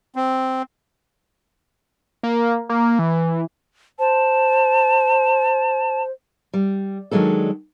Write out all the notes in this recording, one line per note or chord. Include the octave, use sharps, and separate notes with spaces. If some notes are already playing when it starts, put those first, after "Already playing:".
C4
A#3
A#3
E3
C5 A5
G3
D#3 F#3 G#3 D4 A4